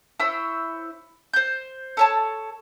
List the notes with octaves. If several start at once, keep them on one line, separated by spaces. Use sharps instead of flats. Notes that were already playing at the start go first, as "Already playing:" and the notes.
E4 C5 C#5 E6
C5 G6
A4 C#5 A5